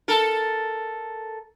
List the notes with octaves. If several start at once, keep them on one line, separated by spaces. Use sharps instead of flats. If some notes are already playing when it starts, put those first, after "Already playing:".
A4 A#4